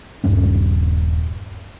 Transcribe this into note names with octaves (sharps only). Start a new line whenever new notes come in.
D#1 G2 G3 C#4